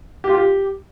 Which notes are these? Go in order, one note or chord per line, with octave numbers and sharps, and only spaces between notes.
G4
F4
G4